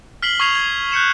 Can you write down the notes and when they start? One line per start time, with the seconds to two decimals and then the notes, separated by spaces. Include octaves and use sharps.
0.22 F6 B6 C7 F#7 G7
0.40 C#6 D#6 G#6 C7 F7 G7
0.55 G#6
0.92 F#6 G6 C#7 E7